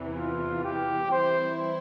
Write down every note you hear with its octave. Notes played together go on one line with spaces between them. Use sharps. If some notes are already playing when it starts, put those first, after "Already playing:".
Already playing: E2 C3 E3
F4
G4
E3 G3 C4 E4 C5